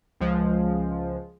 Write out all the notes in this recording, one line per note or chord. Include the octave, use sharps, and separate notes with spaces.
C#2 F3 G#3